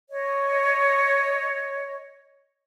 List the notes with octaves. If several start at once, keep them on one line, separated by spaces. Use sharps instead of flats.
C#5 D#5